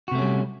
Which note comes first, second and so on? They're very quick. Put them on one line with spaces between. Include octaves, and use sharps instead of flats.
F#4 C3 A3 C#4 G3